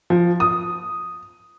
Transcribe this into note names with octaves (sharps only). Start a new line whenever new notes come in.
F3
D#6